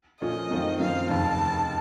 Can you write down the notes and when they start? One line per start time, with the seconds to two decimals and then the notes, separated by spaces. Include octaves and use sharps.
0.21 A#2 F3 A3 C#4 F4 D#5
0.51 F#2 D#3 A3 C4 F4
0.80 F#2 F3 C4 F5
1.10 F1 D#2 C#3 A5